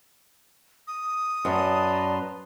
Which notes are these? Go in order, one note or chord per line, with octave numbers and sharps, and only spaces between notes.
D#6
F#2 B4 D5 A5 A#5 C6